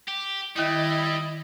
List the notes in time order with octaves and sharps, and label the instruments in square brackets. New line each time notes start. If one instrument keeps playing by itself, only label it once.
[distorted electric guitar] G4
[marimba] D#3 G5 G6 [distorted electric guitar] G3 [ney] E4 [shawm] D#5